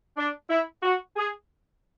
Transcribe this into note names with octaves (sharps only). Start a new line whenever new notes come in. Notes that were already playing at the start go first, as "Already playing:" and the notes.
D4
E4
F#4
G#4